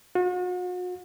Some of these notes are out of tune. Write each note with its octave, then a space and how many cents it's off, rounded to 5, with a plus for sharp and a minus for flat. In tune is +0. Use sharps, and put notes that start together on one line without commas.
F#4 -40